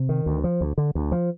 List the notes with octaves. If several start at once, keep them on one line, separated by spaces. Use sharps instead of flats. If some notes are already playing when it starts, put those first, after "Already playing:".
Already playing: C3
D#3
D2
F3
D2
D3
D2
F3